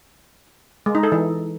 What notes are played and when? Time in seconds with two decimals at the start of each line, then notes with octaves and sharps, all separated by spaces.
0.86 G#3
0.95 D#4
1.03 A4
1.12 E3